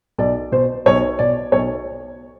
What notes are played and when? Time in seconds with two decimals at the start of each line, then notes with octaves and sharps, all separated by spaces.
0.18 B1 D5
0.52 B2 C5
0.86 B1 C#5
1.19 B2 D5
1.52 B1 C#5